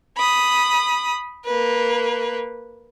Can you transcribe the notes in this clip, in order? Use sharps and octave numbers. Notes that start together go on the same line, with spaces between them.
B5 D#6
A#3 B4